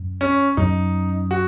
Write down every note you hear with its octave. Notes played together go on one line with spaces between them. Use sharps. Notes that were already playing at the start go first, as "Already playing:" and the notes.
Already playing: F#2
C#4
F#2 F#3 C#4 D#4
F#4